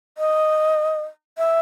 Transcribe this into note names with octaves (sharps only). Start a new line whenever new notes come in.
D#5
E5